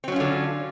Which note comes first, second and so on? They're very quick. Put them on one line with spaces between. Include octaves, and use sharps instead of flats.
C4 F#3 C#4 F4 D3